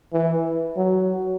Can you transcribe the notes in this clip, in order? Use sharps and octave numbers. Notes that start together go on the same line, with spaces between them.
E3
F#3